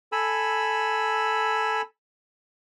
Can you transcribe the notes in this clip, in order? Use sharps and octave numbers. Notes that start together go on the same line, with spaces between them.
A4 G#5 B5 E6